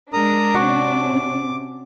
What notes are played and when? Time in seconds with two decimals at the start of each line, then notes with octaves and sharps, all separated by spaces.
0.13 G#3 D4 A#4 A#5 D#6
0.54 C3 C4 C#4 F#4 D6